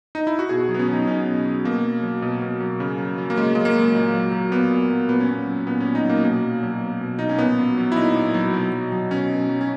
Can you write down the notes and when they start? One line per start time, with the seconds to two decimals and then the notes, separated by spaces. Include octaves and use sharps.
0.15 D#4
0.27 E4
0.39 F#4
0.49 B2 G#4
0.69 F#3
0.74 B3
0.79 C#4
0.88 F#3
0.93 D#4
1.07 B2 C#4
1.26 B2
1.45 F#3
1.65 B2 A#3
1.83 F#3
2.03 F#3
2.22 B2
2.42 B2
2.60 F#3
2.80 C#3
2.98 F#3
3.18 F#3
3.30 A#3
3.37 C#3 G#3
3.55 C#3 G#3
3.65 A#3
3.75 F#3
3.95 A#2
4.14 F#3
4.32 F#3
4.51 A#2 B3
4.71 A#2
4.91 F#3
5.09 A#2 B3
5.20 C#4
5.29 F#3 B3
5.47 F#3
5.67 A#2 B3
5.80 C#4
5.86 A#2
5.95 D#4
6.05 F#3 A#3
6.24 B2 A#3
6.43 F#3
6.63 F#3
6.81 B2
7.01 B2
7.19 F#3 D#4
7.29 C#4
7.38 A#2 B3
7.58 F#3
7.77 F#3
7.92 E4
7.96 A#2 D#4
8.15 A#2
8.34 F#3
8.54 B2
8.72 F#3
8.92 F#3
9.11 B2 C#4
9.31 B2
9.49 F#3
9.61 C#4